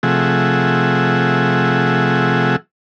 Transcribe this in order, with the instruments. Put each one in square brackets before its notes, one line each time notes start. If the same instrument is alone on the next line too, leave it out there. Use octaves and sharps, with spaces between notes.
[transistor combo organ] C3 F3 A3 G#4 E5 F#5